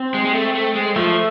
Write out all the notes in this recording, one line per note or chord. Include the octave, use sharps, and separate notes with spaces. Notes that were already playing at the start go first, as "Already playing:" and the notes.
Already playing: C4
G#3
G#3
A3
A3
G#3
F3 A3